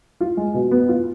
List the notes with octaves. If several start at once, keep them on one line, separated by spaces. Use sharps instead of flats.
F4
G#3
B2
B3
F4